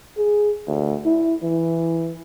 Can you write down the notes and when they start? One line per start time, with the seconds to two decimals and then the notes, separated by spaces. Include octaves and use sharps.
0.18 G#4
0.67 D2
1.05 E4
1.43 E3